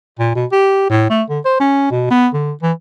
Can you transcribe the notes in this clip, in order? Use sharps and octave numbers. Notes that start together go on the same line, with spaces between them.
A#2
B2
G4
A2
A3
D3
C5
C#4
B2
B3
D3
E3